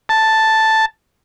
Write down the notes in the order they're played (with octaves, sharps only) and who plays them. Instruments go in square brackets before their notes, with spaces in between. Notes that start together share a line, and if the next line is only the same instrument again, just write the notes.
[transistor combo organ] A5